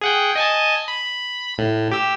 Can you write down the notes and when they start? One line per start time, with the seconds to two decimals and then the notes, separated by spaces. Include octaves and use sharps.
0.01 G#4 F#5 G5
0.36 D#5 G#5 A5
0.88 B5
1.58 A2
1.92 G4 E6